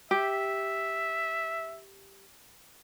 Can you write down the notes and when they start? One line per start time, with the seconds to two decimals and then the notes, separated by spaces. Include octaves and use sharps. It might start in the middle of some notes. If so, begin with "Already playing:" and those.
0.11 G4 E5